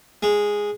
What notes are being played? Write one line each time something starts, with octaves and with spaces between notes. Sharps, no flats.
G#3